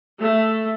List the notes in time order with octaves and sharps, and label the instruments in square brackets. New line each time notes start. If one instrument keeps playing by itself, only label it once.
[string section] A3